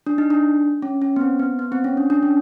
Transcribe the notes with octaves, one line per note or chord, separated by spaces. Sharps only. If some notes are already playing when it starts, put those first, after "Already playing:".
D4
D#4
D4
C#4
C#4
B3
C4
B3
B3
C4
C#4
D4
D4
C#4